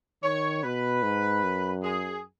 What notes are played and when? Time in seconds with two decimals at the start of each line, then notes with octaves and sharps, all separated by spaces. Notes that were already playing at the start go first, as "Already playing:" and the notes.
0.23 D#3 C#5
0.64 B2 B4
1.03 G#2
1.43 F#2
1.83 G#4